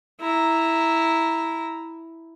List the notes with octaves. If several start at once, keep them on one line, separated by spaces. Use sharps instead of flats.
E4 A#5